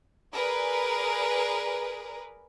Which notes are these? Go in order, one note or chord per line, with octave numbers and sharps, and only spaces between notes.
G#4 A#4 B4 D5